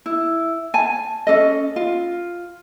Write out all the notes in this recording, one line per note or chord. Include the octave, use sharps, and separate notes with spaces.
E4
G#5 A5
C#4 D4 A4 D#5
F4